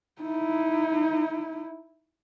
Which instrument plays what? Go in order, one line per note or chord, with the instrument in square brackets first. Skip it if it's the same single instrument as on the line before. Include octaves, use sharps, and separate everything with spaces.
[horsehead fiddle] D#4 E4